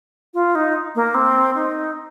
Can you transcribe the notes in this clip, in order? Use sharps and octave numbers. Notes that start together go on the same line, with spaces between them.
F4
D#4
A#3
C4
D#4